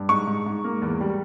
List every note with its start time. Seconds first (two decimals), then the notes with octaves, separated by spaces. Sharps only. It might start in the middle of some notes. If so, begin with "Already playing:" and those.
Already playing: G2
0.09 G#2 C#6
0.27 G#2
0.46 G#2
0.64 A#3
0.82 E2
1.00 G3